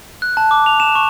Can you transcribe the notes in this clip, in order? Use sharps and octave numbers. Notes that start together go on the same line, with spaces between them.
F#6
A5
D6
F7
E7
C#6